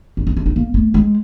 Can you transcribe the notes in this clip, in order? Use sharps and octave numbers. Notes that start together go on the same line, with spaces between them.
D4
D#4
D4
D#4
A#3
A3
G#3